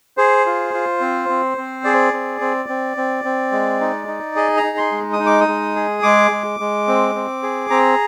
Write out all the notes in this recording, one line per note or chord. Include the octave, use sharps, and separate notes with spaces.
G#4 C5
F4
F4
C4
C4
C4
G#4 D5
C4
C4
C4
C4
C4
G#3
D#4
D#4
G#4 D#5
A#5
D#4
C6
G#3
D#6
D#4
D6
D#6
G#3
G#4
G#3 D6
G#3
G#3
C4
C4
G#4
C4 A#5